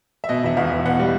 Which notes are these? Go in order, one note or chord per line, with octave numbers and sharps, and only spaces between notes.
E5
B2 D#5
E1 E5
E1 F5
B2
B2 F#5
G3